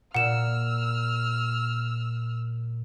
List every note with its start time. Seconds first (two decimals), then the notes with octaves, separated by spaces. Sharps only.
0.15 A#2 F#5 E6 F6 E7